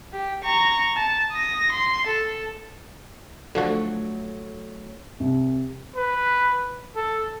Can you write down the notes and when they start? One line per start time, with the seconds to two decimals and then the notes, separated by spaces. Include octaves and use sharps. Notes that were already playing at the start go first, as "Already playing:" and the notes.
0.13 G4
0.44 A#5 C#6
0.96 A5
1.32 D#6 A#6
1.72 C6
2.07 A4
3.55 D3 F3 F#3 A3 F#4
5.20 C2
5.96 B4
6.96 A4